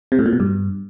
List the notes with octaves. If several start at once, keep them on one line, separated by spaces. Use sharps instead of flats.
C3
A2
A#2
B2
G2